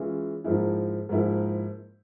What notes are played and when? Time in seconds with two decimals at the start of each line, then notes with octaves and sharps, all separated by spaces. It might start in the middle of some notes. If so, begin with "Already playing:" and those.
Already playing: E3 G#3 C#4 F4 G#4
0.44 G#2 F3 A#3 E4 G#4
1.09 G#2 F3 A#3 E4 G#4